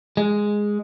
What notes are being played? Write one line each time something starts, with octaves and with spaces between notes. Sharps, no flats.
G#3